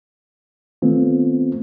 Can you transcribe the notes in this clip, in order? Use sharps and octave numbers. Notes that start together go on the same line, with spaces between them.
D#3 A3 B3 C4 F4